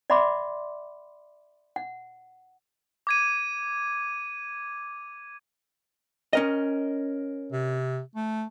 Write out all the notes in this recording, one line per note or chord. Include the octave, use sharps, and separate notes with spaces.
D5 E5 F#5 B5 C6 D6
F#5
D6 G#6 D#7
C#4 A#4 D#5
C3
A3